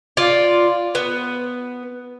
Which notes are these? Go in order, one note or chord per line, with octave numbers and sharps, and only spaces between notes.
F4 D5
B3